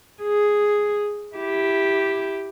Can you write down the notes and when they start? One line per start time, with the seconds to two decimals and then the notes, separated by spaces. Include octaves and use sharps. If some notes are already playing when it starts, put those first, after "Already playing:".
0.23 G#4
1.35 E4 G4